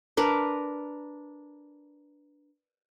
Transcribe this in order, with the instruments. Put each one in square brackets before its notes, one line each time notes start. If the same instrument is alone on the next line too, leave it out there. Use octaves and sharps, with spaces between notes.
[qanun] D4 A#4 B4